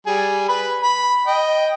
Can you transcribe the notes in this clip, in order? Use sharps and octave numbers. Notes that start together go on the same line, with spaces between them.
G3 G#4
B4 B5
B5
D#5 G5